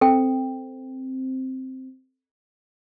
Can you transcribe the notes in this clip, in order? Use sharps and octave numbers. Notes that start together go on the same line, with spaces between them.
C4 A4 G5